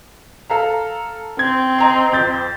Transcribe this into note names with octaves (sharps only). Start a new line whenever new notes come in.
A4 F5 A#5
C4 G#6
D#5 A#5 C6
F2 G6 A6